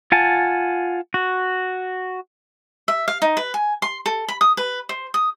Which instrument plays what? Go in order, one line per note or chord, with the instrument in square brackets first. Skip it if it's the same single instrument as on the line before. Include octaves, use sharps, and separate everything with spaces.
[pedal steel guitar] F4 F#5 G#5 A5
F#4
[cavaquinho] E5
F5
D#4
B4
G#5
C6
A4
B5
D#6
B4
C5
D#6